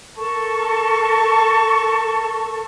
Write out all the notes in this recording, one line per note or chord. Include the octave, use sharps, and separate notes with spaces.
A4 A#4 A5 C#6